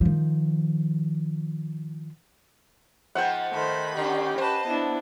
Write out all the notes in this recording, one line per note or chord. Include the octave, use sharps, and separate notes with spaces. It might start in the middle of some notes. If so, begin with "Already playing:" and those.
D#3 F3
G#2 F3 B3 F#5 G5
D#3 A3 C5 B5
D3 C#4 G4
B4 C5 D#5 A5
B3 D4 E4